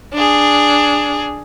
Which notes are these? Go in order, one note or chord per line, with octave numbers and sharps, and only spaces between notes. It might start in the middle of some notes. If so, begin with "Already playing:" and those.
D4 G#4